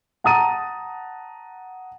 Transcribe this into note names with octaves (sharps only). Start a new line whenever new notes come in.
F#5 A5 A#5 D#6 A6 D#7